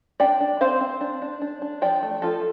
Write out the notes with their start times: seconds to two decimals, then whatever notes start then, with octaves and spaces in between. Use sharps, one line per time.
0.20 D4 D5 G5
0.40 D4
0.61 C4 C5 F5
0.81 C4
1.01 D4
1.22 D4
1.41 D4
1.62 D4
1.82 F3 D5 G5
2.03 A3
2.22 F3 F4 A4